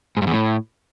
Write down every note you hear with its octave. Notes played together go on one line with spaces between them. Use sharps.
G#2
G2
E2
A2